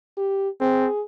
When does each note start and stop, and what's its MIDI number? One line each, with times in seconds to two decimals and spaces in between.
0.17 0.49 67
0.61 0.88 60
0.61 1.02 68